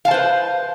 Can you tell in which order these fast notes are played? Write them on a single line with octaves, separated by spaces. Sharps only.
F5 A5 C5 B4